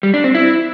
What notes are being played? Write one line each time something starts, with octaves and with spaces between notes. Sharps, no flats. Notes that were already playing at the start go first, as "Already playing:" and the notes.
G3
D4
C4
E4